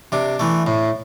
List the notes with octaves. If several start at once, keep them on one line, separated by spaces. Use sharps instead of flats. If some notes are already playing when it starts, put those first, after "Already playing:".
C3 D4
E3 A3
A2